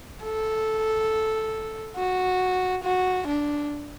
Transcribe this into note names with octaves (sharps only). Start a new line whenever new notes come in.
A4
F#4
F#4
D4